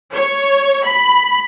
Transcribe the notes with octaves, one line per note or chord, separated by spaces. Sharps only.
C#5
B5